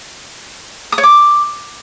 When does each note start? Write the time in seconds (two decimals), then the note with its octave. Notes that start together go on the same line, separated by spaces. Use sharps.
0.92 D#6
0.98 C#5
1.03 D6